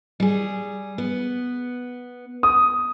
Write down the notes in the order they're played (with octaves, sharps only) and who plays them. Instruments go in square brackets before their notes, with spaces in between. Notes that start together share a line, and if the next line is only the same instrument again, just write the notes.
[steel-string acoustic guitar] G3 G#4
B3
[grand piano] D#6